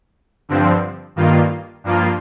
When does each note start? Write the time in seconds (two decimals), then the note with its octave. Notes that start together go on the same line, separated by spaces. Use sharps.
0.49 G2 D3 F3 C4
1.16 G2 D#3 A#3 F4
1.84 G2 F3 A#3 F4